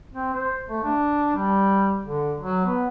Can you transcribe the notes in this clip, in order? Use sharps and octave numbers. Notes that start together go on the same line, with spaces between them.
C4
C5
A3
D4
G3
D3
F#3
B3